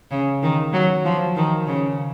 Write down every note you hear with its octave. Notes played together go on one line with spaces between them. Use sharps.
C#3
D#3
F#3
F3
D#3
C#3